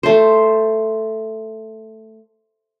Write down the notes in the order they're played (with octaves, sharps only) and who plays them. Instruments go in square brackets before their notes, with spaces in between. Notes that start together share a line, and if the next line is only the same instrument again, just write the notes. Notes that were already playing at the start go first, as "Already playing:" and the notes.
[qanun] A3 C5